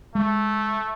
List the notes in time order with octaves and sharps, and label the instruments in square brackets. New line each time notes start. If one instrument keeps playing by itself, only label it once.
[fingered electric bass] G#3 [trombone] A3